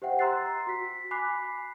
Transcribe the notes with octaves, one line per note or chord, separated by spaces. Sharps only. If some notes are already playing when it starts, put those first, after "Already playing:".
G4 C5 E5 F#5 G5
A#5 C6 E6 F#6 A6 C7
F#4 B6
G#5 B5 D6 F#6 B6 C7